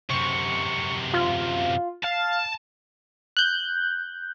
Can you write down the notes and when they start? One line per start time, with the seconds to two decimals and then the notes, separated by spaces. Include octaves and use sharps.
0.10 F#2 C3 C#6
1.13 F4
2.04 F5 A5
3.37 F#6 G6